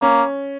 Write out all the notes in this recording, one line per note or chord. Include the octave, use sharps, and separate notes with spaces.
A#3 C#4